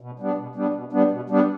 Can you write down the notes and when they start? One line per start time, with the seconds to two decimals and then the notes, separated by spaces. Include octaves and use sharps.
0.01 B2
0.20 G3 B3 D4
0.37 B2
0.55 G3 B3 D4
0.74 B2
0.93 G3 B3 D4
1.11 B2
1.30 G3 B3 D4